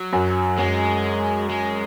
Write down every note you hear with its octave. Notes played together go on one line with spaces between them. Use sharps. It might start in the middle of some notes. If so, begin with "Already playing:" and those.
Already playing: F#3
F#2
F#2 G#3
G#3